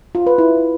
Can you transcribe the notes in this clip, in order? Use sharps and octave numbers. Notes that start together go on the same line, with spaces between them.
F4
B4
E4